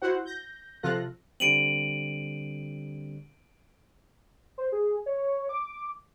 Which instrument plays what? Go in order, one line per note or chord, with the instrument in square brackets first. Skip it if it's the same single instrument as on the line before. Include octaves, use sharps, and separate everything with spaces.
[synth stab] E4 F#4 C5 F#5
G6 A#6
C3 F3 F4 A4 F#6 A#6
[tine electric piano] D3 G3 C4 [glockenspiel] D7 D#7 F#7
[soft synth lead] C5
G#4
C#5
D6